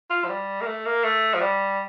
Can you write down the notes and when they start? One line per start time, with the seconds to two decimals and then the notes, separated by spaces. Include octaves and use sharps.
0.10 F4
0.25 F3
0.30 G3
0.61 A#3
0.66 A3
0.86 A#3
1.04 A3
1.35 F3
1.42 G3